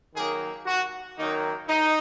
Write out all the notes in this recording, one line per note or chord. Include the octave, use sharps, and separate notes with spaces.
F#2 D#3 F#3 A#3 G#4
F#4
F#2 D#3 F#3 A#3 D#4
D#4